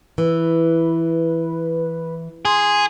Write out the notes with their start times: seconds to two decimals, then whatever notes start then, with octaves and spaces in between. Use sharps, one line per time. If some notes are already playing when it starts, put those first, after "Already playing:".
0.18 E3 B4
2.45 G#4 C6